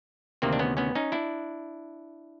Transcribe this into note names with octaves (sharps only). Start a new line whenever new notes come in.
D2 C3 D#3 A#3 C4
D4
B3 C#4
B3 C#4
C#4 D#4
D4 E4